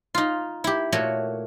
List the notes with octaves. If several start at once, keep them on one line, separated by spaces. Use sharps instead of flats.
D#4 F4
E4 G4
A#2 A3 F#4 C#5